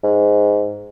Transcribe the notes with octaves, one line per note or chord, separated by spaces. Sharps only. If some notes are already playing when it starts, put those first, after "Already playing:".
G#2